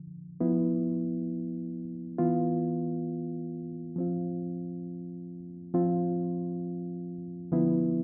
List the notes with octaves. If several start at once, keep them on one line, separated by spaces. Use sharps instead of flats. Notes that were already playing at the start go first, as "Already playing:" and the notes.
Already playing: D3 F3
F3 B3 E4
E3 B3 F4
F3 C4 F4
F3 C4 F4
D3 F3 B3 E4